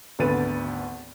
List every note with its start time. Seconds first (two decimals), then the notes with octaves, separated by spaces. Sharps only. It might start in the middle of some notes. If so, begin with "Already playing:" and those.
0.19 G#1 D2 D3 B3 A6 D#7